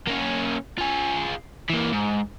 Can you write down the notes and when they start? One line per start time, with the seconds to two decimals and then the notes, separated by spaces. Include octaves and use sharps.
0.07 A#3 C#4
0.78 F4 G#4
1.70 E3 A#3
1.92 G#2